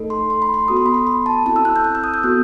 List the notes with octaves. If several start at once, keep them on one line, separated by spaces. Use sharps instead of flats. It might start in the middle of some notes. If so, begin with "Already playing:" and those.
Already playing: A3 D#4 A4
C6
C6
B5
C6
B3 F#4 A4 D#6
C6
B5
C6
B5
A5
C4 E4 A4 A5
E6
F#6
G6
F#6
E6
D#6
G6
B3 F#4 A4 F#6